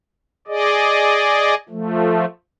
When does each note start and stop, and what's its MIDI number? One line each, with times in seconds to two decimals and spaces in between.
0.48 1.54 68
0.48 1.54 74
0.48 1.54 75
1.69 2.25 53
1.69 2.25 57